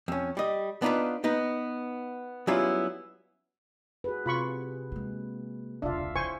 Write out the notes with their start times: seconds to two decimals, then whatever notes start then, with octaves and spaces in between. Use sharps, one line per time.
0.08 F2 C#4
0.37 G3 D#5
0.82 B3 D4 D#4 F4 B4
1.24 B3 D#4 B4
2.47 F#3 G3 B3 C#4 E4 F4
4.04 F#4 G#4 B4
4.26 C3 F4 B5 C#6
4.92 G#3 A#3
5.82 E1 C#2 D4 F4 E5 F5
6.16 E3 C5 G#5 C#6